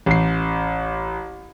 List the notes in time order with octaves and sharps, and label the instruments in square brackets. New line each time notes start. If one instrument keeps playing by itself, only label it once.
[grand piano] A1 C7